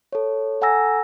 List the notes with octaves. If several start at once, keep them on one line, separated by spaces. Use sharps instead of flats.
A4 C#5
A4 F#5 G#5 A#5 E6 A#6